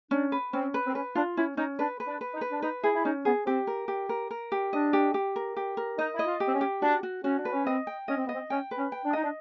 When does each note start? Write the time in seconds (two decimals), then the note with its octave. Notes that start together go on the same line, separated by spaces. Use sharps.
0.11 C#4 D4
0.32 B4
0.52 C4 C#4
0.74 B4
0.87 C4
0.94 C#4 B4
1.15 D4 F4
1.37 C#4 E4
1.57 C#4 D#4
1.79 D4 B4
2.00 B4
2.07 D4
2.21 B4
2.34 D#4
2.41 B4
2.51 D4
2.62 D#4 B4
2.84 E4 G#4
2.96 E4
3.05 C#4 D#4
3.25 B3 G#4
3.46 C4 G4
3.67 A#4
3.88 G4
4.09 A#4
4.31 A#4
4.52 G4
4.73 D4 D#5
4.93 G4
5.14 G4
5.36 A#4
5.57 G4
5.77 A#4
5.98 D#4 D#5
6.15 E4 D#5
6.27 F4
6.40 G4
6.48 C4
6.54 C#4
6.61 G4
6.82 D4 F#4
7.03 F#4
7.24 C#4 F#4
7.39 D4
7.45 B4
7.52 C#4
7.66 C4 D#5
7.87 G5
8.08 C#4 D#5
8.18 C4
8.27 B3 D#5
8.35 C4
8.50 C#4 G5
8.71 B4
8.78 C#4
8.92 G5
9.05 D4
9.13 D#4 D#5
9.24 D4